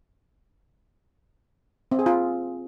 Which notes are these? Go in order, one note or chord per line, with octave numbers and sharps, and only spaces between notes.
C4
G#4
F4